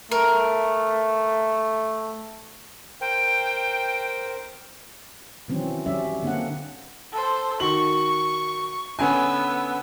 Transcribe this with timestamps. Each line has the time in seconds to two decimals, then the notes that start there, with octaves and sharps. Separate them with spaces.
0.11 A3 A#4
3.01 A#4 C5 G5
5.48 B2 D#3 E3 F#3 C4 C#4
5.86 F#3 G3 C#4 D5 E5
6.23 D3 A#3 C4 D4 F#5
7.13 A4 C5
7.60 D#3 F#4 C#6 F#7
8.99 D3 B3 C#4 G#5 E6